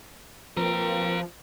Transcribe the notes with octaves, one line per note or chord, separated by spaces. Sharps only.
F3 A#3 C4 A#4 B4 A#5